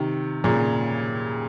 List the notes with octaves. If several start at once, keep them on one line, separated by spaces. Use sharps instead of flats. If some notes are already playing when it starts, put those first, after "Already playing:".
Already playing: C3 D#3
A#2 C#3